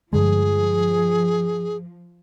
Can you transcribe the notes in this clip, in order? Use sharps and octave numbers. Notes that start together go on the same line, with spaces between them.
G2 D3 F3 G#3 G#4